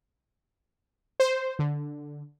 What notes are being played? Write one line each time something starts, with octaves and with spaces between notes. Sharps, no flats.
C5
D3